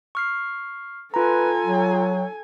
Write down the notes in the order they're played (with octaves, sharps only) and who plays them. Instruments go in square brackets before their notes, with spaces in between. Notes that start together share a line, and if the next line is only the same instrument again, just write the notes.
[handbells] C#6 F6 C7
[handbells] F4 A#5 [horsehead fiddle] A4 G#5 [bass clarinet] B4
[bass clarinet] F#3